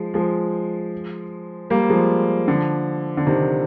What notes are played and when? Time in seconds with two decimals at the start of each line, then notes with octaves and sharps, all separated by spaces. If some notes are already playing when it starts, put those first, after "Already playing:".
Already playing: F3 G#3
0.14 F3 G#3
1.70 G3 A#3
1.90 F3 G#3
2.48 D3 F3
3.17 D3
3.26 C3 D#3